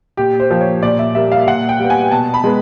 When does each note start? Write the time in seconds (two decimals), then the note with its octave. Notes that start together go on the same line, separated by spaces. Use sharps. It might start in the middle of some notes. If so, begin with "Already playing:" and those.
0.17 A#2 G4
0.40 C5
0.50 F3 A#3
0.61 C#5
0.83 A#2 D5
0.99 E5
1.15 G3 A#3 E5
1.32 F5
1.47 A#2 F#5
1.69 G5
1.79 G3 B3
1.90 G#5
2.12 B2 A5
2.34 B5
2.44 G#3 B3